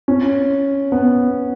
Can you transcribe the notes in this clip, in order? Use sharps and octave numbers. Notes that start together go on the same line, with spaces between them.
C#4
B3